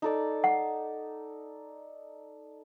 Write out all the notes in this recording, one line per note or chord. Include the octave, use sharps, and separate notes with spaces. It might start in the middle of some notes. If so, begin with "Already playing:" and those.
D#4 A4 D5
F#5